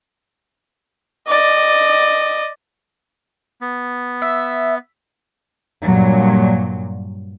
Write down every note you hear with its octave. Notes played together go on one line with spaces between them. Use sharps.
D5 D#5
B3
E5
G2 A#2 F#3